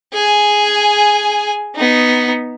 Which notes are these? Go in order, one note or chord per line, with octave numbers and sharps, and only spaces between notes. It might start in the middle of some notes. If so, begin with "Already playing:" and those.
G#4 G#5
B3 D#4